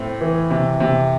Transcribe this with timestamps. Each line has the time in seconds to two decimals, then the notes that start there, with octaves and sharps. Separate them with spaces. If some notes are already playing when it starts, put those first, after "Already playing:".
Already playing: A2 C4
0.21 E3
0.50 C3
0.80 C3